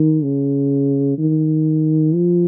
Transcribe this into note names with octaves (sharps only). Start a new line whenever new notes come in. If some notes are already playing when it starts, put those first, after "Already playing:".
Already playing: D#3
C#3
D#3
F3